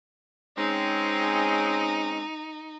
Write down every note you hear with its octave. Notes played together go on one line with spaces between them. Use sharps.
G#3 C4 C#4 D#4